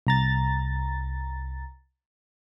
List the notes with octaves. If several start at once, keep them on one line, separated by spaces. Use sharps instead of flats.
C2 A#5 A6